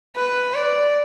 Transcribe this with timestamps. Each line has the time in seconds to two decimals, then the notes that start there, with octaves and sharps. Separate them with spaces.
0.16 B4
0.54 D5